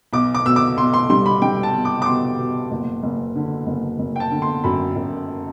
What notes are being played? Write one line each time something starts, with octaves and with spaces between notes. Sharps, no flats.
B1 D6
D6
B2 E6
D6
B1 C6
C6
G3 C6
B5
G3 G5
A5
B2
D6
D6
B2 C6
B2
F#1
F#1
D3
F#1
F#1
G5
A5
D3
C6
F#2 B5
F#2